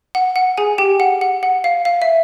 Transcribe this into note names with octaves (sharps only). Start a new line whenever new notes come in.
F#5
F#5
G#4 G#5
G4 G5
F#5
F#5
F#5
F5
F5
E5